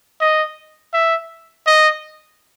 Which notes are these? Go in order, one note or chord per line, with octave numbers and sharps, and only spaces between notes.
D#5
E5
D#5